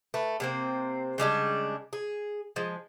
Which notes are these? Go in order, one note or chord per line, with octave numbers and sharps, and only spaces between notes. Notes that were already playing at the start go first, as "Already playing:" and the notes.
A3 B4
C3 A#3 C4
C#3 G3 G#3 D4
G#4
F3 G#3